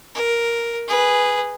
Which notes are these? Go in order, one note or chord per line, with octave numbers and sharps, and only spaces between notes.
A#4
G#4 B4